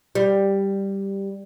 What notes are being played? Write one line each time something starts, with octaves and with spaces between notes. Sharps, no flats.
G3